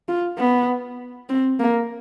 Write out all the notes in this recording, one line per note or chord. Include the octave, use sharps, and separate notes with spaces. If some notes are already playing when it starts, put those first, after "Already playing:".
F4
B3
C4
A#3